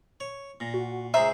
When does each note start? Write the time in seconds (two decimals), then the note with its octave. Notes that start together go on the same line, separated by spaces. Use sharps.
0.20 C#5
0.60 A#2 A#6
0.74 F#4
1.14 C#2 G#4 C5 E5 A#5